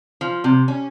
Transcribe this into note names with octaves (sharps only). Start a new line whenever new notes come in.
F3
C3
C#4